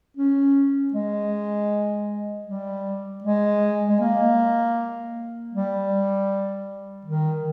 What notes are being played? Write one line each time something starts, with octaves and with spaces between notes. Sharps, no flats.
C#4
G#3
G3
G#3
G#3
A#3
G3
D#3